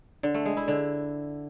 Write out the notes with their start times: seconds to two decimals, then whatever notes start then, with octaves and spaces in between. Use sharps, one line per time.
0.23 D3
0.34 A3
0.46 G#3
0.57 E4
0.68 D3